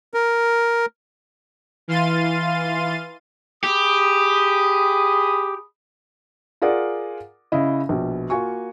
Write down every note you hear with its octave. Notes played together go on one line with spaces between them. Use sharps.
A#4
E3 F5 C6 A6 D#7
G4 G#4 B5 D#6
F4 G#4 A#4 D5 F#5
C#3 E4 D#5
A#1 B2
A#3 F4 F#4 G#5 C#6